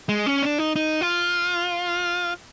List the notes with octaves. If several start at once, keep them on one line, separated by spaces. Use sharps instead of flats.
G#3
C#4
D4
D#4
D#4
F4